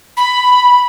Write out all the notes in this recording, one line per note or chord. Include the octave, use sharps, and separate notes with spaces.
B5